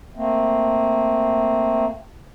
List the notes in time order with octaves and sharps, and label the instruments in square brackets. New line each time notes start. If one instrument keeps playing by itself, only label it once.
[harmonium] A3 A#3 C4